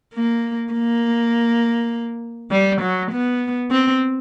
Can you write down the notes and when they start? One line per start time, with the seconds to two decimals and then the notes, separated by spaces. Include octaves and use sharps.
0.14 A#3
0.73 A#3
2.51 G3
2.82 F#3
3.12 B3
3.71 C4